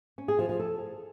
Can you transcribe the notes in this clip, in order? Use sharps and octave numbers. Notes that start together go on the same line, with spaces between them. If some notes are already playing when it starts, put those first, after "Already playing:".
C#4
G#4
F3
F3
A4